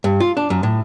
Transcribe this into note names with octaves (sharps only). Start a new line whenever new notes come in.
G2
F4
D4
F#2
A2